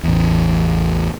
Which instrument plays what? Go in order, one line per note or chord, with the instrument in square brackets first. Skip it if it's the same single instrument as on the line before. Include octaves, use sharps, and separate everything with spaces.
[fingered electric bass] A1 E2